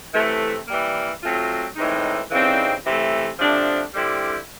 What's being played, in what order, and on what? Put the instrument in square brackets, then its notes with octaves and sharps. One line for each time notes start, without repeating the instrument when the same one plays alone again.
[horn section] C3 E3 A3
E3 G3 A#3
F#3 A3 C4 F4
A2 E3 G#3 C4 D#4
C#3 E3 G3 C4 D#4
C3 E3 A3
C3 F3 A3 D4
D3 G3 C4 E4 G4